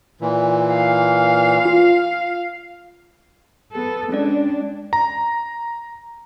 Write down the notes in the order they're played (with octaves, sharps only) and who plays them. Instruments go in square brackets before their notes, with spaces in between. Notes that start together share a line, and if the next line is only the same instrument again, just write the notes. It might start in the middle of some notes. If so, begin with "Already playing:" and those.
[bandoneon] A#2 E3
[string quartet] F5
[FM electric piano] F4
[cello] B3 A4
[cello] G#3 D4 [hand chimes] C#4 D5
[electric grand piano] A#5